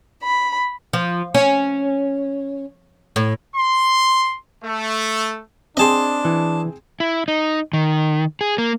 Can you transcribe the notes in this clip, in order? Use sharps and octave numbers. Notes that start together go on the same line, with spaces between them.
B5
F3
C#4
A2
C6
A3
C4 D4 G#4 D#5 A5 C6
E3
E4
D#4
D#3
G#4
A#3